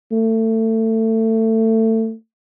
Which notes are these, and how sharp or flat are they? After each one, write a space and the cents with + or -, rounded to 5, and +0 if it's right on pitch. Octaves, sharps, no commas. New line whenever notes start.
A3 +25